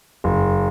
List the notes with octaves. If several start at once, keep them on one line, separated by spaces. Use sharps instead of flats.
F#1